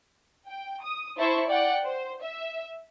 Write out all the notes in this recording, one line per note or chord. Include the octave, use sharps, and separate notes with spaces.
G5
D#6
E4 C5 E5 A5 C#6
D5 F#5 G5
C5
E5